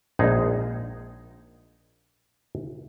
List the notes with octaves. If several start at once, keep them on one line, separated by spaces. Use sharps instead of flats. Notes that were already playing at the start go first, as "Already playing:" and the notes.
A#1 G#3 D#4 G#4